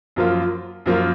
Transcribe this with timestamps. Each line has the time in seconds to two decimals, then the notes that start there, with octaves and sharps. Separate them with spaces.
0.16 F#2 F3 A#3 F4
0.86 F#2 F3 A#3 F4